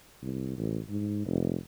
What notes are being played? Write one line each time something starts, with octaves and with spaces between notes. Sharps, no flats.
C2
A1
G#2
F1